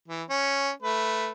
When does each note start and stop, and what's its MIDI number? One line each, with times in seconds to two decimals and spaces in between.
0.08 0.23 52
0.30 0.70 61
0.82 1.31 57
0.82 1.31 71